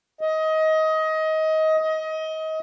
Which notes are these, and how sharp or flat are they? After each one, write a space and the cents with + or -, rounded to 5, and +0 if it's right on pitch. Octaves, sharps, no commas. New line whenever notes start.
D#5 +20
D#5 +25